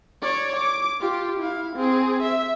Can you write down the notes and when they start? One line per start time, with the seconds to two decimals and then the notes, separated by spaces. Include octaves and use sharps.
0.22 C#5 D5
0.56 D6
1.00 F4 G4
1.39 E4 F5
1.76 C4 G#4
2.22 E5